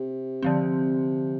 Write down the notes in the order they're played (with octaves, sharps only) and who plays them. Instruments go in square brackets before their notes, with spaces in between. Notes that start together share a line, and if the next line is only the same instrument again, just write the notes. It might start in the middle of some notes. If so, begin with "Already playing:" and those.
Already playing: [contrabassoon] C3
[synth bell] D3 F3 C4